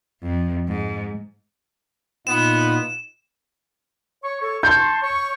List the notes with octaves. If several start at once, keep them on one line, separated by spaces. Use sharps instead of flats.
F2
G#2
A#2 B3 D#4 F4 E7
C#5 C#6
A4 C#5 C#6
A5 C6 C#6 G6
C#5 C#6